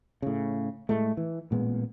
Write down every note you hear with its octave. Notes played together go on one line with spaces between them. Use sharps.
A2 C#3
A2 G#3 A3
E3
A1 A#2 G#3 B3